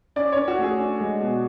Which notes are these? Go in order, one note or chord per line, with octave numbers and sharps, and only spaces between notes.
C#4 D5
C#4 C#5
F#4
A3
G#4
D4
G#3
B2